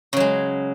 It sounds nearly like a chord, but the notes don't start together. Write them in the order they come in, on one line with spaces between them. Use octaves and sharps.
C#3 F#3 G#3